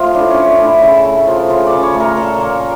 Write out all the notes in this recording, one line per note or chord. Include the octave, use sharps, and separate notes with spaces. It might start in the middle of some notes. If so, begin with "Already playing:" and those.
Already playing: F3 A3 F4
A2 D4
C#4
A2
D4
A3 E4
C#3 E4
A3
F3
C#3 F4
D5
C#3
C#5
A3
A#4
A#2 A4
A#4
A#3